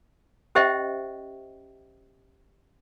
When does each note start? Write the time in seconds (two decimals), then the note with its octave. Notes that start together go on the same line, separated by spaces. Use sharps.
0.55 C#4 G4 C5 D#5 E5 G5